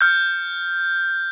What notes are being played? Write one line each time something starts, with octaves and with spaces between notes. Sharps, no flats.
F6 G6